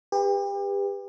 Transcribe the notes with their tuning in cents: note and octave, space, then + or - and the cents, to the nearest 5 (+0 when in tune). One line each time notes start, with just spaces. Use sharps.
G4 +35 B4 +0